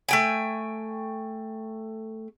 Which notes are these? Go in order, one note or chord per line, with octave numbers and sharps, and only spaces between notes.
A3 G5 G#5